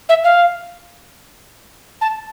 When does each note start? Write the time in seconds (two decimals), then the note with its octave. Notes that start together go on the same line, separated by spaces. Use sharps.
0.09 E5
0.24 F5
2.01 A5